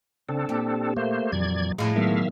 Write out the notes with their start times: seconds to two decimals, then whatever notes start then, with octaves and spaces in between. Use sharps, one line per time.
0.29 C#3 C4 D4 A4
0.49 A#2 G4
0.97 A3 A#3 C5
1.32 F2 A#2 E3 F#3 D5 G#6
1.78 F2 A2 G#3 F5 B5
1.96 D#3 F#3 B3 E5 F5